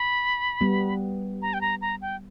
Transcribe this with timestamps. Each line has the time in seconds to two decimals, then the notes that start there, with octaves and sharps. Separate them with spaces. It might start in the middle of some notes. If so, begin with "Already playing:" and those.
Already playing: B5
0.61 G3 B3
1.42 A#5
1.53 G5
1.61 A#5
1.81 A#5
2.02 G5